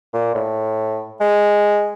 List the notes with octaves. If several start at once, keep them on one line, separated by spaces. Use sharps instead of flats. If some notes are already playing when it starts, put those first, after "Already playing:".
A#2
A2
G#3